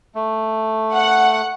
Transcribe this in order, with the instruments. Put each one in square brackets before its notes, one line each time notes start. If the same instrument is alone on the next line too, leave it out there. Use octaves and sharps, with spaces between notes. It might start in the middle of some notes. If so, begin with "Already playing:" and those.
[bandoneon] A3
[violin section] F#5